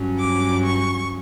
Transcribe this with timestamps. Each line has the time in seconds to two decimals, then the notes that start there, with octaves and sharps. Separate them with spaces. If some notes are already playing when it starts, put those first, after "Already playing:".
Already playing: G2 F#3 C#4
0.19 D6
0.66 C#6